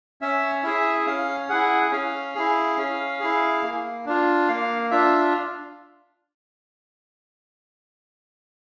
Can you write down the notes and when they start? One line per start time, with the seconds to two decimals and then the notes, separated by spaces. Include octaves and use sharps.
0.21 C#4 E5
0.64 E4 G#4 E5
1.06 C#4 F5
1.49 E4 G#4 F#5
1.91 C#4 F5
2.35 E4 G#4
2.77 C#4
3.20 E4 G#4
3.63 A#3
4.06 D4 F4
4.48 A#3 F5
4.91 D4 F4 E5